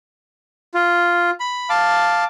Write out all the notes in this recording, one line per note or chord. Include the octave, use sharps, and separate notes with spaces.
F4
B5
F5 A5 D6